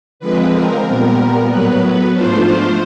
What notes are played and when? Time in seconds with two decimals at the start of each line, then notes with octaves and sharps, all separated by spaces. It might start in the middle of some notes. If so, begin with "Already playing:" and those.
0.20 D3 F3 G#3 C4 B4
0.52 A#4
0.85 A#2 G3 B3
1.48 A2 F#3 B3 B4
2.13 G#2 F3 A3 D4 F4 C5
2.45 C5